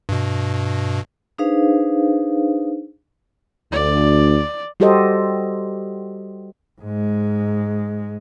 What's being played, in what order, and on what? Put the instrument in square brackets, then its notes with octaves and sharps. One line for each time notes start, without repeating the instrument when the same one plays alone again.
[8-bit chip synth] G2 B2
[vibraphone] D4 D#4 G#4 B4 C5 F5
[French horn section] D2 [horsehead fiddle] D5
[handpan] G3 F#4 G4 A4 C5 D#5
[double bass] G#2 G#3